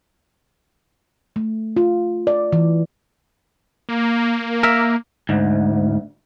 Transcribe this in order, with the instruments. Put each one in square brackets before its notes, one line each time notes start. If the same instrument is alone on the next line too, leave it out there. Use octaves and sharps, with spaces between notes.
[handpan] A3
F4
D5
E3
[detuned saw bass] A#3
[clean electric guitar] A#4 E5
[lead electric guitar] D2 G#2